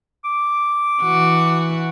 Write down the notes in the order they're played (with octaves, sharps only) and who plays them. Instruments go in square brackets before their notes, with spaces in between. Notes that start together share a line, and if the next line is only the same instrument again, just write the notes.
[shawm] D6
[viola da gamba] E3 F#4